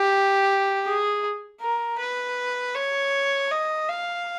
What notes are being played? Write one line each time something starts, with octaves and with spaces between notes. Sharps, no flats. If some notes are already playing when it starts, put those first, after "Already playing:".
Already playing: G4
G#4
A#4
B4
C#5
D#5
F5